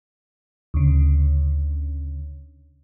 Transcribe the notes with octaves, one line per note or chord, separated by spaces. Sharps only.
D2 C#3